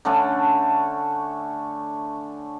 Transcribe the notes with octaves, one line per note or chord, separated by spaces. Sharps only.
D3 A3 C#4 D4